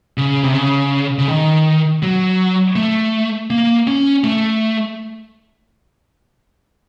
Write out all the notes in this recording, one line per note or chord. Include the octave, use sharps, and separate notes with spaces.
C#3
C3
C#3
C#3
D#3
F#3
A3
A#3
C#4
A3